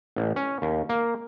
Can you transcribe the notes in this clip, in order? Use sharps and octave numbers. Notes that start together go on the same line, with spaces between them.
A1
C#4
D#2
A#3